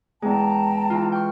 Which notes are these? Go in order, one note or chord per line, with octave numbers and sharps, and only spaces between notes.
E2 G#3 G5 A5 A#5
E3 F4
G5 C#6 F6